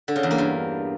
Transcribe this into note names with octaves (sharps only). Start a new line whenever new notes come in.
D3
C#3
E2
A#3
G2